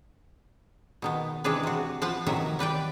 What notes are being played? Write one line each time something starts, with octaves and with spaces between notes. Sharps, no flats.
B2 D#3 B3
C3 E3 G#3 D4 G#4 B4
C3 F#4
F3 B4 F5 F#5
C3 D#3 E3 F#3 A#4 E5
G3 B4 D5 G5